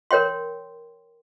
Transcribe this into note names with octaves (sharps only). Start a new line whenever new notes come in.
A#4 C#5 G5 C6